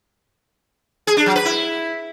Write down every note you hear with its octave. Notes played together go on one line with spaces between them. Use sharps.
G#4
D4
F#3
B4
E4